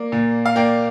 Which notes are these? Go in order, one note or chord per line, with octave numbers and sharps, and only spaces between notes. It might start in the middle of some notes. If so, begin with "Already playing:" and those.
Already playing: A#3 D5
A#2
F5
A#3 D5 G5